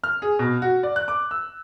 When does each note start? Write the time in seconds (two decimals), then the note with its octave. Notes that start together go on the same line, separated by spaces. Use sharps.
0.04 F6
0.22 G#4
0.39 B2
0.62 F#4
0.83 D5
0.96 F#6
1.08 D6
1.31 E6